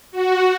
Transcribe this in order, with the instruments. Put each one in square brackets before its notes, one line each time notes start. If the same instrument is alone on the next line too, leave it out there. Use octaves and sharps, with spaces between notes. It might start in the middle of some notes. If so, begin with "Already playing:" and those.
[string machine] F#4